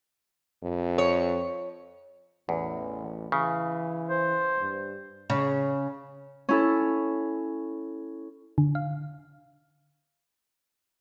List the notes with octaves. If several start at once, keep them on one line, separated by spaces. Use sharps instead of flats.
F2
C#5
A1 E2
C#3 E3
C5
G2
C#3
C#4 E4 A4
D3
F5